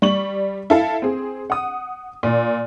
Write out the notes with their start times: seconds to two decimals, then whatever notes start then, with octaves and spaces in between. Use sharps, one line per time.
0.02 G3 C#6 F#7
0.70 E4 A4 F5
1.02 C4 G#4
1.50 F#5 D#6
2.23 A#2